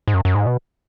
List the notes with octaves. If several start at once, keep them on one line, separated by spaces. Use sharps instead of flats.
G#2
F#2
F#2
G#2
B2